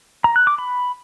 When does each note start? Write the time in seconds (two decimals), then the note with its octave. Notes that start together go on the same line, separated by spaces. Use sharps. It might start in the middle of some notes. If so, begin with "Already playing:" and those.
0.24 A#5
0.36 F#6
0.47 D6
0.58 B5